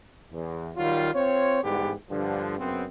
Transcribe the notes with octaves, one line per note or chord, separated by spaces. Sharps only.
E2
D#3 F#3 G3 F4
C4 F4 C5 C#5
G#2 D3 E3 G3 B3 G4
G2 D3 F3
F#2 C#3 B3 C4